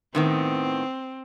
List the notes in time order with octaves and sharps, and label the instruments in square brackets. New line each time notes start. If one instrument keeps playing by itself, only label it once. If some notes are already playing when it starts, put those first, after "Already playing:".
[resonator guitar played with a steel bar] A2 D#3 B3 [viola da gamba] C4